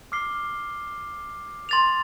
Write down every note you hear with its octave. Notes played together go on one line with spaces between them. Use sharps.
D6 F6 C7 G7
C6 A6 F7